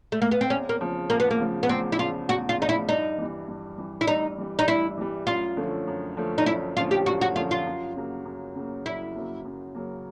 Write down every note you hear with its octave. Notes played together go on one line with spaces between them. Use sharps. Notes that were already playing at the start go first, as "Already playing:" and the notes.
A3
A#3
B3
C4
E2 C#4
A#3
C#3 F3
E2 A#3
B3
A#3
C#3 F3
B3
E2 C4
E4
C#3 F3 F4
E2 F#4
F4
C#3 F3 D#4
E4
G2 D#4
E3 G3
G2
E3 G3
E4
G2 D#4
E3 G3
D#4
G2 E4
E3 G3
F#2 F4
D3 F3 A3 C#4
F#2
D3 F3 A3 C#4
D#4
F#2 E4
D3 F3 A3 C#4 F4
G4
F#2 F#4
F#4
D3 F3 A3 C#4 F4
F4
F#2
C#3 F#3 A#3
F#2
C#3 F#3 A#3
F#2 E4
C#3 F#3 A#3
F#2
C#3 F#3 A#3